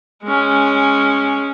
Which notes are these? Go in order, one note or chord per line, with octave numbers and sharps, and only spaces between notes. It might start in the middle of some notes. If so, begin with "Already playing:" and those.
G#3 C#4